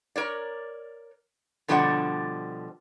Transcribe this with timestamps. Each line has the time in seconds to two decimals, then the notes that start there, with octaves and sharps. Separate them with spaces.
0.16 A#4 C#5 D5
1.68 B2 D3 F3 G3 D4 F#5